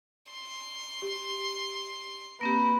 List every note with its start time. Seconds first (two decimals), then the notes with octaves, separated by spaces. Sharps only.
0.33 C6
1.02 G4
2.41 A#3 C4 G4 B4 A#6